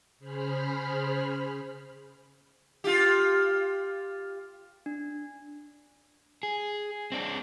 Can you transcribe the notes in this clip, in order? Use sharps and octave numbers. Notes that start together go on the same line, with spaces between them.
C#3 G#4 C5 B5 F6
F4 G4
D4
G#4
C4 D4